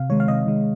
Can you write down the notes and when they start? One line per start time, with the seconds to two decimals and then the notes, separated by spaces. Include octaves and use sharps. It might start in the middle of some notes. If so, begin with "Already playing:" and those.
Already playing: C3 F5
0.10 D#3 G#3 C#5
0.20 F5
0.28 C3 D#5
0.46 D#3 G#3